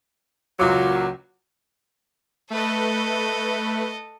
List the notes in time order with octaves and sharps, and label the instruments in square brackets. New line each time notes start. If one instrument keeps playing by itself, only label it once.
[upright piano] C#2 F4 D6 [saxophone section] A#2 F#3
[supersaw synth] A3 B4 [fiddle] A4 D#5